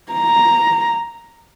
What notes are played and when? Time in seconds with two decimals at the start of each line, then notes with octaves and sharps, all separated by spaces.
0.13 A#5